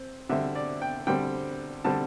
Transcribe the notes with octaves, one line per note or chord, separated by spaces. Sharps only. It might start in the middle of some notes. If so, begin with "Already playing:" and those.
Already playing: C4
D3 G3 C4 E5
D5
G5
D3 G3 C4 G5
D3 G3 C4 A5